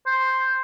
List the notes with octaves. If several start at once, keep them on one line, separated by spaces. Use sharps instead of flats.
C5